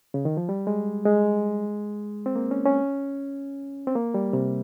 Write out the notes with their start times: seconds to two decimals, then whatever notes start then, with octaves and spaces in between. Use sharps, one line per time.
0.14 C#3
0.25 D#3
0.37 F3
0.49 G3
0.67 G#3
1.05 G#3
2.26 C4
2.35 A#3
2.51 C#4
2.65 C#4
3.87 C4
3.95 A#3
4.14 G3
4.33 C3